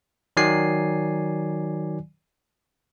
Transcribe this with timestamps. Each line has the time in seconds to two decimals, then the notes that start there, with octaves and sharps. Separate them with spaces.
0.37 D#3 F#3 D5 G#5 C7